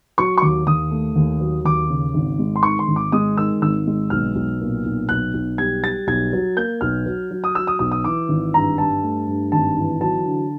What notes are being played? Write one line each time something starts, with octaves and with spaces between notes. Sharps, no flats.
F#3 C#6
C#6
D#2 D6
D#2 D#6
A3
D#2
F#3
D#2 D6
C#3
G#1
G#3
C6
D#3 C#6
C6
G#1
D6
G#3 D#6
D#3 E6
G#1 E6
G#3
B1 F6
B1
A#2
B1
B1 F#6
B1
G3 G#6
G3 A6
B1 G#6
F#3
A#3 G6
B1 F6
F#3
F#3
D#6
F#3 E6
D#6
B1 D#6
D#6
E3 D6
G#1
G2 A#5
G2 A5
A3
G2
G#1 A5
E3
F#3 A5
D3